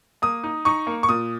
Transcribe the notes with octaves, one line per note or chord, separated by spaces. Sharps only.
A#3 D#6
D#4
D#4 C#6
A#3
C#6
A#2 D#6